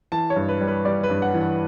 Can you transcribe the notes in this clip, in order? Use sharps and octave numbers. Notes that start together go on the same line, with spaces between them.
E3 A5
C#5
G2
B4
G3
B4
G3 D5
B4
G2
F#5
E3
F#5